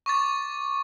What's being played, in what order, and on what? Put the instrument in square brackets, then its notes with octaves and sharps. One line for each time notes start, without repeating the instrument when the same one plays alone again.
[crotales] C#6 D6 A6